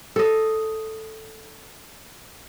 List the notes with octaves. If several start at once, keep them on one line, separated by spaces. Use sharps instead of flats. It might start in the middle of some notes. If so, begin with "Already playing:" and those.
A4 D#5